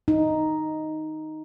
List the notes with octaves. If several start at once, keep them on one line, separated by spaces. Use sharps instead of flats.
D#4